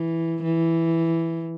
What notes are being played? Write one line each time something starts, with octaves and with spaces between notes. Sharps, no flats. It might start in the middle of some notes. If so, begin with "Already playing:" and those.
Already playing: E3
E3